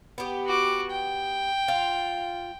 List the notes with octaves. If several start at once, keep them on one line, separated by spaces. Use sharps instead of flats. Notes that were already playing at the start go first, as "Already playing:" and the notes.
B3 G4
F#4 D6
G5
F4